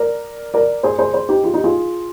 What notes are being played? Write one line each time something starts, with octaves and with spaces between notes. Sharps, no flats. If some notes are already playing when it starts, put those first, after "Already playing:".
Already playing: A#4 D5
A#4 D5
G#4 C5
G#4 C5
G#4 C5
D#4 G4
F4 G#4
D#4 G4
F4 G#4